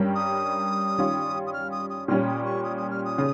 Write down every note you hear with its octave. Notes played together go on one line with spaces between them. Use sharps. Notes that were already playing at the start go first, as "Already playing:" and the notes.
Already playing: G2 G3 C#4 G4 A#4
D#6
D#3 G3 C#4 F4
D#6
F6
D#6
D#6
A#2 G3 C#4 F6
D#6
C#6
D#6
D#6
F6
D#6
C#3